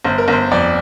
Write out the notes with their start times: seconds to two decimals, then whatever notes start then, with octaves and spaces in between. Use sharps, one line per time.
0.04 G1 C5
0.18 A#4
0.28 G1 C5
0.51 F2 D5